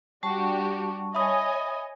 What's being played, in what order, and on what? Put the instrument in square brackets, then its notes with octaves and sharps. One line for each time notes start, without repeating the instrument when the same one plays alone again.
[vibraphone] G3 A5 C#6 [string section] D4 F#4 G4
[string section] C#5 D#5 G#5 [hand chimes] E5 B5 D#6